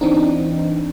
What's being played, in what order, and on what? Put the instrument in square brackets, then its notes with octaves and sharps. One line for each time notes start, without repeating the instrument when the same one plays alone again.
[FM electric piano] E3 C4 D4 D#4